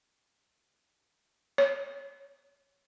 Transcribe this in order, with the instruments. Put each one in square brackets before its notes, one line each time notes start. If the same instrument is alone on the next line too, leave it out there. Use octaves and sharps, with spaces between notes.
[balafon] C#5